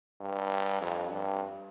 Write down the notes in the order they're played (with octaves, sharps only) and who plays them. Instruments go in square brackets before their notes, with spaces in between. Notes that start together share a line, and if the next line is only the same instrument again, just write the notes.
[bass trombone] G2
F2
G2